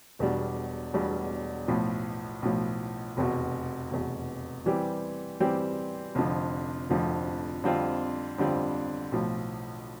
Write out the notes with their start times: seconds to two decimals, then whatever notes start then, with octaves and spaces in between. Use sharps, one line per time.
0.19 E1 E2 B2 G3 D4
0.93 E1 E2 B2 G3 D4
1.68 B1 A2 F3
2.42 B1 A2 F3
3.17 F1 E2 B2
3.91 F1 E2 B2
4.66 E3 G3 C4 G4
5.40 E3 G3 C4 G4
6.15 F1 F2 D3 F3
6.90 F1 F2 D3 F3
7.64 F2 D3 G3 C4 F4
8.38 F2 D3 G3 C4 F4
9.12 B1 A2 F3